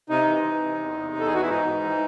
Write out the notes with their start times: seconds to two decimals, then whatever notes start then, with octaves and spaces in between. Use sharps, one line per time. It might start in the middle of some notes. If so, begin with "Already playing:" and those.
0.09 C3 D#4
0.27 E3
0.44 E3
0.62 C3
0.80 E2
0.97 C3
1.14 E2
1.19 A4
1.26 G#4
1.32 E3 F#4
1.42 E4
1.49 G#2 D#4
1.66 G#2
1.84 E3